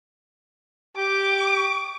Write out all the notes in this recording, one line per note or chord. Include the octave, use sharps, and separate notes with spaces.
G4 D6